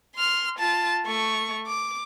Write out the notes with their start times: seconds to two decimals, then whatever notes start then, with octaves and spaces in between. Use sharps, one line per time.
0.16 C6 F6
0.59 F4 A5
1.06 A3 C#6
1.66 D6